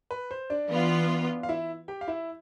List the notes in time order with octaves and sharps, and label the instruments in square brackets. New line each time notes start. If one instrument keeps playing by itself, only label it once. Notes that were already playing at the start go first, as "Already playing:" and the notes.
[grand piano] B4
C5
D4 D5
[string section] E3 B3 F4
[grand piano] F5
E4 E5
G4 G5
F5
E4 E5